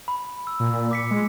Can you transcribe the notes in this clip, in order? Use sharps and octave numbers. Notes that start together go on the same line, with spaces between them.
B5
E6
A#2
D6 B6 C#7
G#3